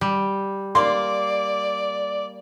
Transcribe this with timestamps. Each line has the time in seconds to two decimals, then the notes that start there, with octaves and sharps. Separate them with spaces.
0.01 G3
0.75 A#3 D5 C6